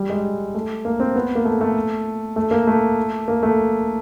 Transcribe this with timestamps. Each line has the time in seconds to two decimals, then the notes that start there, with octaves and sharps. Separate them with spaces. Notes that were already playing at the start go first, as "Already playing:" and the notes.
Already playing: G3
0.09 G#3
0.55 A3
0.85 A#3
1.00 C4
1.16 B3
1.35 A#3
1.45 A3
1.61 A3
2.36 A3
2.51 A#3
2.67 A3
3.28 A#3
3.43 A3